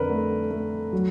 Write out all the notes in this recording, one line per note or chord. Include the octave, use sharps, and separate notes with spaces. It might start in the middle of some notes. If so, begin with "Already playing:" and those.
Already playing: F2 D3 A#4 B4
A3
A3
F#3